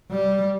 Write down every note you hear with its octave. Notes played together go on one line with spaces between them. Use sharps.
G3